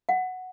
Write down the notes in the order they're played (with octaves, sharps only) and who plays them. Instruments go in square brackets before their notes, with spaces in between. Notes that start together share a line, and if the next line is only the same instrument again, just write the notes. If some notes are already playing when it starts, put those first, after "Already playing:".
[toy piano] F#5